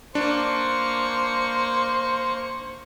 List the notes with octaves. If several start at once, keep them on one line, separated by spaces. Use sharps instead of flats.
A#3 D4 C5 C#6